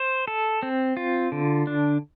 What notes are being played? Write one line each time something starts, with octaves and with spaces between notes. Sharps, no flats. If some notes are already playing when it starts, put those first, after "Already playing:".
Already playing: C5
A4
C4
F4
D3
D4